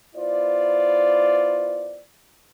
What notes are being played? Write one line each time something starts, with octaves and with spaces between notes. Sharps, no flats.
B3 E4 F4 C5 D5